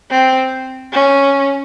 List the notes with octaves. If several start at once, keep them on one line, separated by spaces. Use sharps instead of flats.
C4
C#4